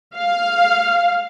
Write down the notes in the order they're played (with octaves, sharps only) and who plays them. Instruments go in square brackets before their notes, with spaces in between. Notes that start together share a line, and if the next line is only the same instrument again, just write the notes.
[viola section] F5